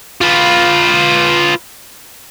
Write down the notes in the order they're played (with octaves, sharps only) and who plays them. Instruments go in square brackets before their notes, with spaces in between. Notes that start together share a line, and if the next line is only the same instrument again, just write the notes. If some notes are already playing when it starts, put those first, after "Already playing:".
[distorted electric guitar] F4 B4